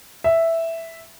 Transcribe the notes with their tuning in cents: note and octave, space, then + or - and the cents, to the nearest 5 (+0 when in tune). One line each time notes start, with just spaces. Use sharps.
E5 +0